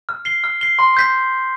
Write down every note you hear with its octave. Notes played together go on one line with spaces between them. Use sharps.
F6
C7 G7
F6
C7 G7
C6
G6 B6